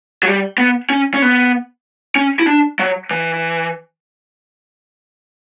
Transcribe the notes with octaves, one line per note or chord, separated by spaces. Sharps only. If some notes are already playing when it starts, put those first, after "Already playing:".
F#3
G3
B3
C#4
C#4
B3
C#4
E4
D4
F#3
E3